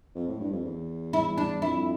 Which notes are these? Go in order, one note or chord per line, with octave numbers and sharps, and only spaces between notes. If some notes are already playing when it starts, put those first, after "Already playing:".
F2
A2
G2
F2
E2
E4
D4
F2 E4